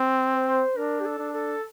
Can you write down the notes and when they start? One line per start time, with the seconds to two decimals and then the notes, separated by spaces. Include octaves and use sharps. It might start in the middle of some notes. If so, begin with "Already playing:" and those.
Already playing: C4
0.34 C5
0.76 D4 A#4
1.00 G4
1.05 A4
1.19 D4
1.33 A4